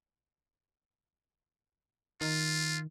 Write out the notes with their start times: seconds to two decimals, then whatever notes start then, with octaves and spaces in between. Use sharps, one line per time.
2.21 D#3 F4